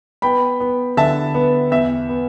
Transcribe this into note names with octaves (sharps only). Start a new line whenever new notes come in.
B3 G5 B5
B3
D3 E5 A5
B3
E2 E5
B3